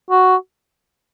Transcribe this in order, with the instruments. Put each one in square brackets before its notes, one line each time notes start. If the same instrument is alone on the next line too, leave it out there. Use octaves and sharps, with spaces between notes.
[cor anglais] F#4